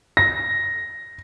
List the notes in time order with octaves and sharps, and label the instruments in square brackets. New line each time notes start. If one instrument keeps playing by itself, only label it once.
[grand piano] A#6